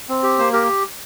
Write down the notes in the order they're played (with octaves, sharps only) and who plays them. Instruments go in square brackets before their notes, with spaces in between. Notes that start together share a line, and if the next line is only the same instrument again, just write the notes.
[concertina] C4
G4
A#3 C5
G4 A#4